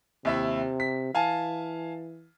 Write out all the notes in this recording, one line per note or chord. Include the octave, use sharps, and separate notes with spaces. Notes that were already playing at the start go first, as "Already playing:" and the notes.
D#2 C3 E4 E5
B6
E3 F5 G#5 A5